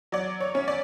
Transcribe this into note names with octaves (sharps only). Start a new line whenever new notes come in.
F#3 D5
C#5
C#4
D5